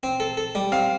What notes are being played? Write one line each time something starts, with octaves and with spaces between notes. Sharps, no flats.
C4
A4
A4
G3
C4 F5